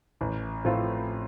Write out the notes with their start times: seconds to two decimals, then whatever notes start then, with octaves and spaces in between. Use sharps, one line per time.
0.21 A1
0.65 A2 F3 C4 F4